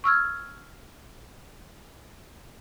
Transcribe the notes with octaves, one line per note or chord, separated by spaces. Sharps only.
C#6 E6 F6 G#6